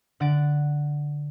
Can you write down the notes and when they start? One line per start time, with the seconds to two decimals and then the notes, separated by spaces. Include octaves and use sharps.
0.20 D3 F#5 F#6 A6 D7